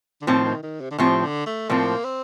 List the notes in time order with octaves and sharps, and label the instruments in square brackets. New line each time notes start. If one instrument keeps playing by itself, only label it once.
[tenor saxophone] D3
[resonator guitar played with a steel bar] A2 F3 C4 [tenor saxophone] D#3
[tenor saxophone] D#3
D#3
C3
D3
[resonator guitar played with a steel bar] A2 F3 C4 [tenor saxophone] C3
[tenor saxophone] D3
A3
[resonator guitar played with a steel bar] A2 F3 C4 [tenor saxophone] A#3
[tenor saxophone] C4